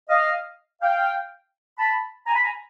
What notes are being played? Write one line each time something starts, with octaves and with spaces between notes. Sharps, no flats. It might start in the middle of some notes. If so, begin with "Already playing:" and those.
D#5 F5
F5 G5
A5 B5
G#5 A#5
B5
G#5 A#5